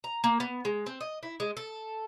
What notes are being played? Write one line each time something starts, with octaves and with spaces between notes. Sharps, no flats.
A#5
A#3
B3
G#3
C4
D#5
E4
G#3
A4